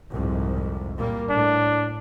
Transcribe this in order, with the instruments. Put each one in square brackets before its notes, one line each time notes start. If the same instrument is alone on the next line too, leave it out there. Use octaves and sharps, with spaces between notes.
[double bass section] C2 F2 G#2
A#2 G3 A#3
[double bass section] A2 [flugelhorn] D4